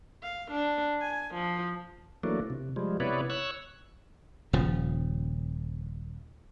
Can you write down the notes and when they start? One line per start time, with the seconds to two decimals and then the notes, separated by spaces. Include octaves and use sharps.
0.23 F5
0.51 D4
1.01 G#5
1.34 F3
2.23 E3 F#3 A3 A#3 D4
2.50 C3
2.76 F3 G3 G#3
3.00 C3 B3 E4 B4 C#5 D5
3.30 C#5 E6 F#6
4.53 D#1 C#3 F3